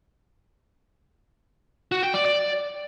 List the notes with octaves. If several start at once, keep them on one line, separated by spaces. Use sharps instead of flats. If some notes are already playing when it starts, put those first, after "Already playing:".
F#4
G5
D5
D5